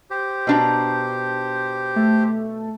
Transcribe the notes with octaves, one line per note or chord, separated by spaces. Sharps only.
G4 C5
B2 D4 A#5
A3